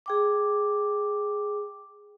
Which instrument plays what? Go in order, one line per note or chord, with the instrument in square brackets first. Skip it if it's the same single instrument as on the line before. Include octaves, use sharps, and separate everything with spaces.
[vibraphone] G#4 G5 D6